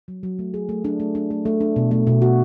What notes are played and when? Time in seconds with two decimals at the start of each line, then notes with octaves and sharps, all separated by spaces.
0.08 F#3
0.23 F#3
0.39 A3
0.54 G#4
0.69 A3
0.85 D4
1.00 A3
1.15 D4
1.30 A3
1.45 A3
1.61 D4
1.76 B2
1.91 A3
2.07 B2
2.22 F#4